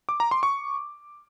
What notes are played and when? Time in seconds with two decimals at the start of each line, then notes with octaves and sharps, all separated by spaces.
0.09 D6
0.20 A#5
0.31 C6
0.43 C#6